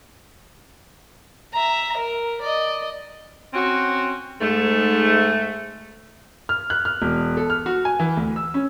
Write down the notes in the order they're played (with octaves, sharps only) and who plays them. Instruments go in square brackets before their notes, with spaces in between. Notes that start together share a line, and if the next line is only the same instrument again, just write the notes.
[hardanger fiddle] E5 A#5
A#4
D5 D#5
[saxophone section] C4 C#4 F#4
G#2 A3
[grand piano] F6
F#6
F6
E1
A4
F6
F#4
G#5
E3
D2
E6
C#4